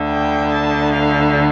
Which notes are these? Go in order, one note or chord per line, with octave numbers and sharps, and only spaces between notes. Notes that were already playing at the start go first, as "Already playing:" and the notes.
Already playing: D2 D3
G5
A5
F5